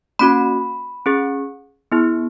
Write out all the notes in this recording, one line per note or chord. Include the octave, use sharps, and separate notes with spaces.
A#3 C#4 F#4 B5
C#4 G#4
B3 E4 G#4